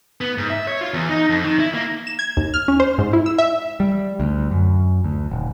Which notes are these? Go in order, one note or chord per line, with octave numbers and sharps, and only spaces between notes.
B3
G#2
E5
C#5
F4
E2
D#4
F2
D#3
E4
A#3
E7
G#6
D#2
F6
C#4
C5
G#2
E4
E6
E5
G3
D2
F#2
D2
D#1